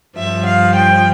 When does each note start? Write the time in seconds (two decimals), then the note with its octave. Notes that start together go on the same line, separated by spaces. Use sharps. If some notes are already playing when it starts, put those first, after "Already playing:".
0.17 G2 F3 E5
0.46 F5
0.76 G5